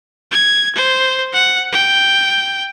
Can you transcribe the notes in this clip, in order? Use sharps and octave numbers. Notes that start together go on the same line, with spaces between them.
G#6
C5
F#5
G5